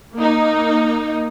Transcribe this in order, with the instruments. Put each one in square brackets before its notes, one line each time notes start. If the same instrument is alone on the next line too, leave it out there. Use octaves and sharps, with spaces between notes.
[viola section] A#3 D#4